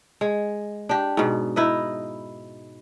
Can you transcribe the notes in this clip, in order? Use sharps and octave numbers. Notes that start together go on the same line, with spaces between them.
G#3
D4 G4
G#2 B2
D#4 E4 B4 D#5